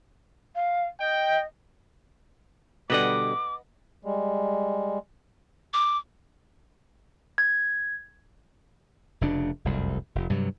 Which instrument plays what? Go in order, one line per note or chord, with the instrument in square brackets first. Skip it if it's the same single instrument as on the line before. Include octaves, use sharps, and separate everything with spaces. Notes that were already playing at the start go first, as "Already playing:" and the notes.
[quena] F5
[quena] D#5 [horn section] G5
[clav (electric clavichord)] B2 D3 G3 [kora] B4 D#5 F#5 [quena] D6
[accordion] G3 G#3
[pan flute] D6
[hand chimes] G#6
[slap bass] F1 C#3 D4
F1 C2 F#2
F1
G2 C3 F#3